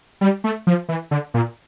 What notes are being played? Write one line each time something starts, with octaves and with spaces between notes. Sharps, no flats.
G3
A3
F3
E3
D3
A#2